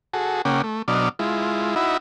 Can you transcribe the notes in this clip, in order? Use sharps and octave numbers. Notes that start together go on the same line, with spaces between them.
F#4 G#4 A4
C#3 A#3 C#4 F#5 G5 D6
A3
B2 F#3 D4 D5 D#5 F6
G#3 E4 F4
D#4 E4 F#4 E5 B5